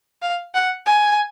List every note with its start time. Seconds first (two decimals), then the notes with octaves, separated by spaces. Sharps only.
0.22 F5
0.54 F#5
0.86 G#5